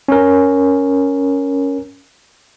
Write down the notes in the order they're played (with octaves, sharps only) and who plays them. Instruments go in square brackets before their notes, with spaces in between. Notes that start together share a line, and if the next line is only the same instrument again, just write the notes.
[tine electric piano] C#4 A#4